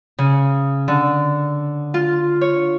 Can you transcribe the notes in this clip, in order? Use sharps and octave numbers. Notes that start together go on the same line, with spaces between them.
C#3
D3
F4
C#5